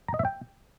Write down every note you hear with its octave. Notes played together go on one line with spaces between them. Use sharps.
A#5
D#5
E5
G5